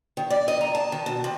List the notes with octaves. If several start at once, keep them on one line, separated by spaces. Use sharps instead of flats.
D#3
D5
D#5
A#5
A5
D#3
B2
C3